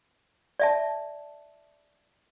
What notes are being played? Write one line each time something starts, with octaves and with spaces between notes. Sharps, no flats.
D5 E5 A5